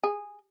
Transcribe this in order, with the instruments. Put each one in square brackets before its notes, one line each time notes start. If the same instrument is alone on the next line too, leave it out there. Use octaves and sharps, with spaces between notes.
[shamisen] G#4